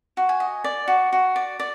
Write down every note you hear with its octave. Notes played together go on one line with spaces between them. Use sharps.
F#4
G#5
D#5
D5
F#4
F#4
D5
D5